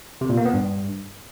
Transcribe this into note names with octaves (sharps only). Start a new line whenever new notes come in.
C3
A#2
A#3
B3
G2